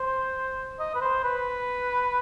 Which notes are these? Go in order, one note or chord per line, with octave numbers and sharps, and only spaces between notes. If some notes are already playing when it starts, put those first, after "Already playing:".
Already playing: C5
D#5
B4
C5
B4